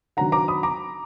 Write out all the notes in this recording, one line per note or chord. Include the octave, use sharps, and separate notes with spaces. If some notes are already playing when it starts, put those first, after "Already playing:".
D#3 F#3 D4 F#5 A#5
A#5 D6
B5 D#6
A#5 D6